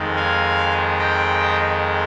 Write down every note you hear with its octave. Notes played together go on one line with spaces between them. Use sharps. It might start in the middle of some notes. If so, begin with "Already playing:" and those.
Already playing: F2 D#3 G#3
F5 G#5
D#5 G5